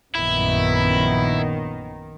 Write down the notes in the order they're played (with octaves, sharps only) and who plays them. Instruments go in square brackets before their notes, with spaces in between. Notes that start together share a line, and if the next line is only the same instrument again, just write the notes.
[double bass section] A#1 F#2 B3 [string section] D#3 [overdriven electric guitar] E4